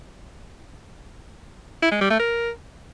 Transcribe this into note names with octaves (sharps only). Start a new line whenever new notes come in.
E4
G#3
G3
A3
A#4